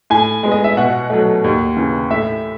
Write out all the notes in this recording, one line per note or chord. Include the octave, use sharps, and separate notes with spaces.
A2 G#5
G#3 B3
D#5
E5
B2 F#5
F#3 A3
D#2
C#3 E3
A2 E5